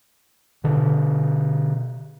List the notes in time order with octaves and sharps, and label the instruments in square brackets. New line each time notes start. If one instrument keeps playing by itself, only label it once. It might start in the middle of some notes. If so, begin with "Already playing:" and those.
[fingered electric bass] B2 D3